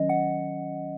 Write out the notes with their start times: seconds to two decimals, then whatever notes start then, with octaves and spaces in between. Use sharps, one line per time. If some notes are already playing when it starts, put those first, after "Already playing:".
Already playing: D#3 F#3 C#4 D#5
0.09 F#5